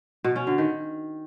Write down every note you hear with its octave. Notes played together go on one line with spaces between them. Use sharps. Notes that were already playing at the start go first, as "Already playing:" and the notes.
B2
C#4
D3
D#3